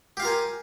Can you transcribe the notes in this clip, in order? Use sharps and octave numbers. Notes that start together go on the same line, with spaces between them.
F4 G4 A#4 F5 G#5